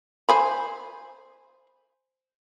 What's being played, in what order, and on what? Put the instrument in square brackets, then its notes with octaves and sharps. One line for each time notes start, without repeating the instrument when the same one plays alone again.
[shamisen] C5 G#5 B5